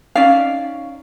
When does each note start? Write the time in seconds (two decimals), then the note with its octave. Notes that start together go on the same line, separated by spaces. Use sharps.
0.15 C#4 D#4 D5 F5